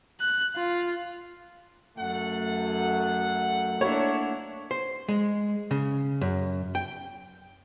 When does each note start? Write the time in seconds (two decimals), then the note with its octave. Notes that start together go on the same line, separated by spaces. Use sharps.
0.20 F#6
0.56 F4
1.98 F#2 A3 F#5
3.81 A#3 D4 E4 C#5
4.71 C5
5.08 G#3
5.71 C#3
6.21 F#2
6.75 G5